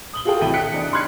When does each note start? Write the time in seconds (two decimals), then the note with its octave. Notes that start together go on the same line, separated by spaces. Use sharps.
0.13 D#6 F#7 G7
0.25 F4 F#4 G#4 A4 G5
0.41 A1 A2 C3 E5 G5 D#7
0.54 F#6 B6 C#7 D7
0.74 E2 D4 D#4
0.93 C6 F6 F#6 G#6 C7 C#7